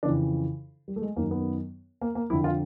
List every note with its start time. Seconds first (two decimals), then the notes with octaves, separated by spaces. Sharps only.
0.03 F2 C#3 E3 D4
0.88 G3
0.96 A3
1.02 G#3
1.16 F#2 D#3 A#3
1.31 B3
2.01 A#3
2.15 A#3
2.30 F2 D3 E4
2.44 F4